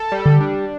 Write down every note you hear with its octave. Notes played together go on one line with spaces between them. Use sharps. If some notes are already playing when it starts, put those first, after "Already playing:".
Already playing: A4
G3
D3
D4